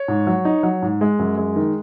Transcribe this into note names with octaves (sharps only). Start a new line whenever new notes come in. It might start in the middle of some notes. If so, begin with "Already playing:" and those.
Already playing: C#5
G#2
F#3
D#4
F#3
G#2
G#3
F#2
G#3
D#3